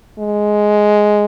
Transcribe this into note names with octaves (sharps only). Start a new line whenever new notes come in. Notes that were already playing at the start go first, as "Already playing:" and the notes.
G#3